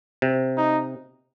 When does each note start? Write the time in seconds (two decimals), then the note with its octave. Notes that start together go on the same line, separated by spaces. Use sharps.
0.22 C3
0.57 D#4